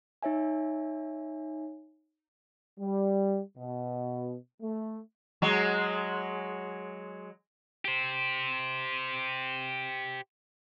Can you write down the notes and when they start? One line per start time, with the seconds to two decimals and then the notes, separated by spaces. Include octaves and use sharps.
0.23 D#4 C#5 E5 G#5
2.79 G3
3.58 B2
4.61 A3
5.42 F#3 G#3
7.85 G4 C5